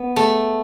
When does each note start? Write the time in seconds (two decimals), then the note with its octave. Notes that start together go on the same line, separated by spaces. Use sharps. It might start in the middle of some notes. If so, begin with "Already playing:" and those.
Already playing: B3
0.16 A3